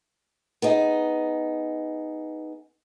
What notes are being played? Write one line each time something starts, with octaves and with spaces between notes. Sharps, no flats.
B3 D#4 G#4